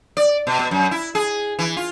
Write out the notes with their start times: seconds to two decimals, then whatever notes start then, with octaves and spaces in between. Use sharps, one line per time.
0.17 D5
0.47 B2
0.59 B2
0.71 F#2
0.91 E4
1.15 G#4
1.59 E3
1.77 F4